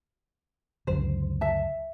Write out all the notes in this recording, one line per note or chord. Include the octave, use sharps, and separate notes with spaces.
C#2 F#2 D3 C5
E5 A5